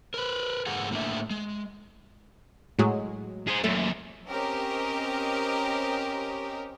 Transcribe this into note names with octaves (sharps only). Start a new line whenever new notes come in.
A#4 B4
G#2 A3 G#4 A#4 F#5
A2 D3 A3 A#3 D4 E5
G#3
A2 F#3 G#3
G#4 C5
F#2 A#2 A3
C4 C#4 G4 A#4 D#5